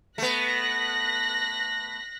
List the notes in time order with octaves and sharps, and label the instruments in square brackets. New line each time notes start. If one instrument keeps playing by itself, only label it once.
[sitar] A3 B3 [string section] F#6 A#6 B6